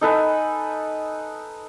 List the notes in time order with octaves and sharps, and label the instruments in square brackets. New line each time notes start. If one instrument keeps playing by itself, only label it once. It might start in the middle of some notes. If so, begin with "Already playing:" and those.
[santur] D#4 A4 B4 G#5